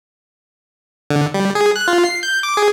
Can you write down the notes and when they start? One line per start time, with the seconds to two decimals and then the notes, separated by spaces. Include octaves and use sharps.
1.10 D3
1.34 G3
1.55 G#4
1.76 F#6
1.88 F4
2.05 C7
2.23 G6
2.43 D6
2.57 G#4